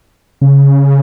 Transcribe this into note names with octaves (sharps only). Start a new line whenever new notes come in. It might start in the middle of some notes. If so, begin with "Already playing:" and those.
C#3